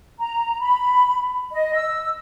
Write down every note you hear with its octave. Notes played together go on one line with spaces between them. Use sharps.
A#5
B5
D#5
E6